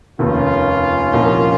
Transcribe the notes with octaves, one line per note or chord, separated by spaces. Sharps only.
F1 D#2 D#3 C#4 F4
C2 A#2 F3 A#3 D#4